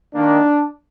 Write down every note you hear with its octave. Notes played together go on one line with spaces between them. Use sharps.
D#3 A#3 D4